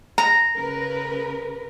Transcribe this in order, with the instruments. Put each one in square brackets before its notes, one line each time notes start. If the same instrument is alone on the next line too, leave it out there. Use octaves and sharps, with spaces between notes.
[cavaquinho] A#5
[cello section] C#3 A#4 B4